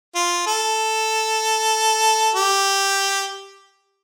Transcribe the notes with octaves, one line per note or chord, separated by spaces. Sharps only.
F4
A4
G4